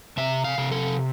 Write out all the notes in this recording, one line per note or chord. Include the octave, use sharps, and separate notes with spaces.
C3 E5
F5
C3
A4